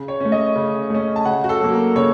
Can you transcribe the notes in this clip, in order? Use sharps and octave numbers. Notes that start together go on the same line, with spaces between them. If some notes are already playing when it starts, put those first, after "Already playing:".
Already playing: C#3
C#5
A3 C#4
D#5
C#3
A3 C#4
A5
C#3 F#5
F#4
A4
F#3 A#3
A#4
C#3 C#5